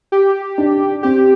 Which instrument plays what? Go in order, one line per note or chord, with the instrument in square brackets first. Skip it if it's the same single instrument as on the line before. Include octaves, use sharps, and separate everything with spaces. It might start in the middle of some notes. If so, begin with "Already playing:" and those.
[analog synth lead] G4
[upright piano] D4
[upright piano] C4 [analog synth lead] G4